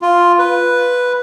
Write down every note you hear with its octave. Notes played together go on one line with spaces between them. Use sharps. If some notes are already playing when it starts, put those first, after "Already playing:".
F4
B4